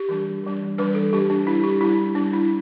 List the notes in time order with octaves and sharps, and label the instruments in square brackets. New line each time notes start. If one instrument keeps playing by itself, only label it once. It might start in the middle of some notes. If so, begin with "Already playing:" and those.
Already playing: [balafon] G4
E3 G3 D4
E3 G3 D4
E3 G3 D4 B4
A4
G3 D4 G4
D4
G3 D4 E4
G4
G3 D4 E4
G3 D4
E4